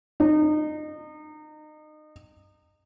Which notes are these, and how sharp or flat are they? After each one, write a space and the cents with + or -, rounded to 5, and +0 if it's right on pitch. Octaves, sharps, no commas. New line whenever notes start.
D#4 -30